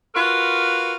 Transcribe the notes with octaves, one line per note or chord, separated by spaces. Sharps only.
F4 F#4 A#4 B4